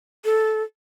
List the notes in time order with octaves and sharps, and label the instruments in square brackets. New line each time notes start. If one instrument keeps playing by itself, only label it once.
[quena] A4